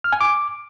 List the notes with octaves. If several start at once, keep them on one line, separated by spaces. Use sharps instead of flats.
F6
G#5
D6